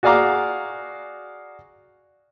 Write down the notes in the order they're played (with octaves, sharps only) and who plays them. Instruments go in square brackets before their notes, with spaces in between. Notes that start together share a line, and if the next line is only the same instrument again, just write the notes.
[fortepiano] F#4 G#4 D5 F5 A#5 D6